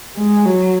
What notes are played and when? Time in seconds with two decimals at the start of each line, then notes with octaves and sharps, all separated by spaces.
0.17 G#3
0.45 F#3